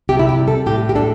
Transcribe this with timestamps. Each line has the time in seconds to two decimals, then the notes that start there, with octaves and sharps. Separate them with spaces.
0.09 C3 G4
0.19 E4
0.29 G4
0.39 G3
0.48 A4
0.66 A2 G4
0.89 G4
0.95 D4 A4